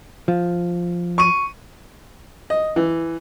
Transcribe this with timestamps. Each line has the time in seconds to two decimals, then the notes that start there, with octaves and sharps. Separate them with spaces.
0.28 F3
1.18 C#6 D#7
2.50 D#5
2.76 E3